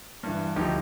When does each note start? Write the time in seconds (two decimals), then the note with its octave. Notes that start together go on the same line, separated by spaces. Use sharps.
0.23 G2 E3
0.56 D2 F3 D#4 G4